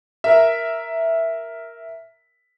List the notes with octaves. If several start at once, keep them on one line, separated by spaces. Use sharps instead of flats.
A#4 E5